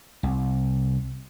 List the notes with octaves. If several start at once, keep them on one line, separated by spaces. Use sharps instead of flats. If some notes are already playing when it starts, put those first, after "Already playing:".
C2